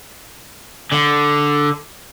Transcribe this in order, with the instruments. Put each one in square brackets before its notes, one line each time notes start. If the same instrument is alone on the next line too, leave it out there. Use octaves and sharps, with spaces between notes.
[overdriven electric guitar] D3